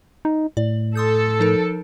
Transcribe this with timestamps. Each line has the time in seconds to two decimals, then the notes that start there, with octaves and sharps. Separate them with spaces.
0.25 D#4
0.57 A2 D5
0.95 A4 C6 D#6 G6
1.40 F3 D#4 A#4